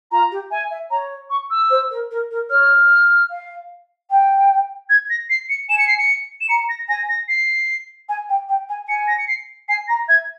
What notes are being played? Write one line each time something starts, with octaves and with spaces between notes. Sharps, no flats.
F4 A#5
G4
E5 G#5
E5
C#5 A#5
C#6
E6
C5
A#4
A#4
A#4
C#5 F6
F5
G5
G#6
A#6
C7
C#7
G#5 E7
C#7
C7
C#7
E7
A#5 C#7
A#6
G#5 A#6
A#6
C7
G#5
G5
G5
G#5
G#5 C#7
A#6
C#7
C7
G#5 C7
A#5 A#6
E5 G#6